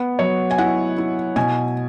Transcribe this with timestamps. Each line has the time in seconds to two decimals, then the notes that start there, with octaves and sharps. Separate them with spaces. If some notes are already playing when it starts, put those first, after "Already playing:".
Already playing: B3
0.19 F#3 C#5
0.51 G#5
0.58 E4 F#5
0.98 E4
1.36 B2 G#5